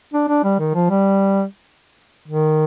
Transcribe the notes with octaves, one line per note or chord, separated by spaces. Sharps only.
D4
D4
G3
D#3
F3
G3
D#3